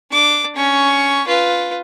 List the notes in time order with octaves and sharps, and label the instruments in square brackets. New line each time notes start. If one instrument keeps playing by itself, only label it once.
[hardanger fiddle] D4 D6
C#4 C#6
F4 B4